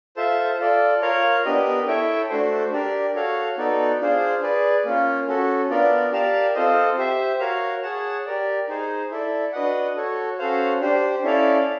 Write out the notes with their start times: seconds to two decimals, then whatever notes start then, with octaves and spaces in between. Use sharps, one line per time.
0.16 F4 A4 C5 E5 A5
0.59 F4 A4 D5
1.02 F4 A#4 C#5 F5
1.45 B3 D4 G4 A#4 D#5
1.87 E4 A4 C#5 E5 G5
2.29 A3 D4 F#4 A4 C5
2.72 D4 G4 A#4 D5
3.15 F#4 A4 C#5 F5
3.58 B3 D#4 F#4 A4 D5
4.00 D4 F4 G#4 C5
4.43 G#4 B4 D5
4.85 A#3 C#4 F4
5.28 C#4 F#4 A4
5.70 B3 D4 F4 A#4 D5
6.13 G4 A#4 D5 F5 A5
6.55 C4 F4 A4 C5 D#5
6.98 G4 C5 E5
7.40 F#4 A#4 C#5 F5
7.83 G#4 C#5 F#5 A5
8.26 G4 A#4 D5
8.68 D#4 G#4 C5
9.11 E4 A4 D5
9.53 D4 F#4 B4 D#5 F#5
9.96 F#4 A4 C#5
10.39 C#4 F#4 A4 C5 F5
10.80 D4 G4 C5
11.23 C#4 E4 A4 D5 F5